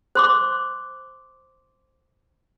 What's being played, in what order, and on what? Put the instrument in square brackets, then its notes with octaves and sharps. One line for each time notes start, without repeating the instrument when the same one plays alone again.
[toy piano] C5 C6 D6